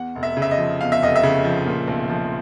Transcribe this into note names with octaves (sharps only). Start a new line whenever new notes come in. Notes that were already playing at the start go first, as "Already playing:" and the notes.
Already playing: E2 F#5
F1
E5
C#3
E5
D#5
F3
E2 F5
E5
F1 D#5
E5
C#3
F3
A#2
B1
F3